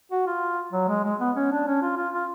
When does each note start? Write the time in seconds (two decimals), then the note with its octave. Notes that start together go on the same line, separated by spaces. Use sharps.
0.11 F#4
0.27 F4
0.73 F#3
0.88 G#3
1.04 G#3
1.20 B3
1.36 C#4
1.52 D4
1.67 C#4
1.82 F4
1.97 F4
2.14 F4